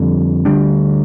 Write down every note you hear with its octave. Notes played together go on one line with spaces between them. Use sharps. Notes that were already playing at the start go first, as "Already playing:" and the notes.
Already playing: F2 D3 G3
D2 D3 G3 D4